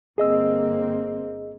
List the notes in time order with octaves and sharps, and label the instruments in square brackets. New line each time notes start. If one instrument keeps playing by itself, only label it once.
[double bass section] G1 A#3 C4 [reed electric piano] G#4 D#5 E6